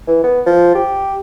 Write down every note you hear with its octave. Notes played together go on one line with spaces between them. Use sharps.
E3
B3
F3
G4